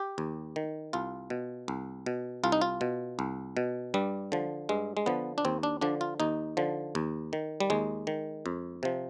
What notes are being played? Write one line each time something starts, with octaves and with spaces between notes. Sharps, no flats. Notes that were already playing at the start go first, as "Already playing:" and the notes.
Already playing: G4
D#2
D#3
C2 F4
B2
C2
B2
C2 F4
D#4
F4
B2
C2
B2
G2 G3
D3 F3
G2 G#3
G#3
D3 F3 B3
D4
D#2 C4
D4
D3 F3 D4
F4
D#2 D#4
D3 F3
D#2
D#3
G3
D#2 G#3
D#3
F2
C3 F3